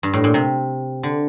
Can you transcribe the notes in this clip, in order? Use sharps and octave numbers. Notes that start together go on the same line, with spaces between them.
G2
A2
A#2
C3
D3